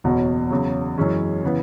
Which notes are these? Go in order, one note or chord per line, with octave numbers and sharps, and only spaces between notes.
F#1 E2 B2 F#3
E2 C#3 F#3
F#2 E3 G#3 C#4
C#3 E3 B3